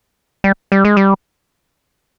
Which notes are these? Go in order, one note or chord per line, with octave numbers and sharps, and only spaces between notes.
G3
G3
G#3
G3